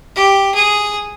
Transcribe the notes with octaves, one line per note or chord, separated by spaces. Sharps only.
G4
G#4